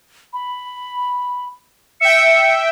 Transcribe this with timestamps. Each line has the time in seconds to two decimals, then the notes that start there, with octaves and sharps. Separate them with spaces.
0.33 B5
2.01 E5 G5 C#7